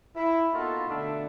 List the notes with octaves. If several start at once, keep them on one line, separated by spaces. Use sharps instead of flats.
E4
A#3 B3 D#4 F4 F#4 A4
B2 D3 A3 D4 E5 A5